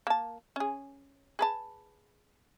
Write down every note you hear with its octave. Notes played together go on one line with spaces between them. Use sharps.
A#3 A5
C#4 G#4
G#4 B4 A5